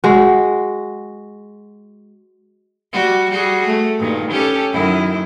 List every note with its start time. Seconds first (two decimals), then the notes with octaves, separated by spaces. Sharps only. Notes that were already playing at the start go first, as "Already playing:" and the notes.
0.04 G#3 F#4
2.93 G3 F#4
3.30 G3 F#4 G#4
3.66 A3
4.00 G2 A#2 D#3
4.30 C#4 G4 A4
4.73 F#2 D#3 E4